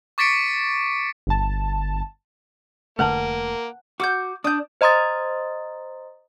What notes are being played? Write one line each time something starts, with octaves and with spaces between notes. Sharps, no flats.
C#6 D6 A6 B6 C#7 D7
G1 A5
F1 D3 A3 A#3 B4 F#5 A5 F#6
F#4 D6 F6 G6
D4 D#6 G6
C5 D#5 A#5 C6 D#6 A6